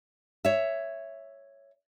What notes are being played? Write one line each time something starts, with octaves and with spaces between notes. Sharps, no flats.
C#5 E5